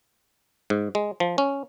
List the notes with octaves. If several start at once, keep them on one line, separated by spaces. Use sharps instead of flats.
G#2
G#3
F3
C#4